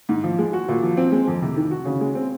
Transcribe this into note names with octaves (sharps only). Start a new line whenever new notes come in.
G#2
F3
G#3
F#4
A#2
F3
C4
G#3
F2
C3
D#3
F#4
C#3
G#3
C4